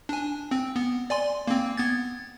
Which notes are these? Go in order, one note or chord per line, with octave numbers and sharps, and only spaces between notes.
D4 G#5
C4
B3
D5 G#5 C6
A#3 C4
B3 G#6 A6